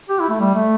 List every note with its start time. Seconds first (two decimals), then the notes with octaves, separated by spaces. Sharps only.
0.09 G4
0.19 E4
0.29 A3
0.40 G3
0.55 A3